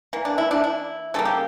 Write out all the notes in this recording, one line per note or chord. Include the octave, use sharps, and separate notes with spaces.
E3 A#3
D4
E4
D4
E4
C#3 G3 A#3 A4
G4